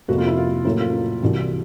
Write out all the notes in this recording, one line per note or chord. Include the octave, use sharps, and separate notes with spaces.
F2 C3 F3 A#3 F#4
F4
E4
F4
A2 F#3 A#3 E4
F4
F4
C2 C3 E3 G3 F#4